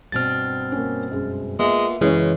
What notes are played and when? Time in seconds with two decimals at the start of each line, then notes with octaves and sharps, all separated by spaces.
0.12 G2 B2 C4 F6 A6
0.72 A#3 C#4
1.11 F#2 G#3
1.59 G#3 A#3 B3 F4 E5
2.01 F#2 C#3 E3 G#3 C#5